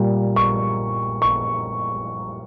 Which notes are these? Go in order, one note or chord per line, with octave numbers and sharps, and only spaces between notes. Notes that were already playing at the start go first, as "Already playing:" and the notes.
Already playing: A#2 G3 A#3
C#6
C#6